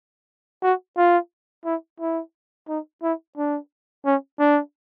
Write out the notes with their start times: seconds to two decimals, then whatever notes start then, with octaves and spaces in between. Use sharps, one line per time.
0.63 F#4
0.97 F4
1.65 E4
2.00 E4
2.69 D#4
3.03 E4
3.37 D4
4.05 C#4
4.39 D4